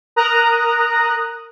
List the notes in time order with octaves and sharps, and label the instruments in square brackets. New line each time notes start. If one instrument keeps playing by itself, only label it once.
[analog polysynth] A#4 A#5 D#6 F#6